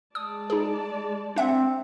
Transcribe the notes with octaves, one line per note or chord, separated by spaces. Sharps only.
G#3 D5 A5 D#6
D#4 G#4
C4 D4 E5 F#5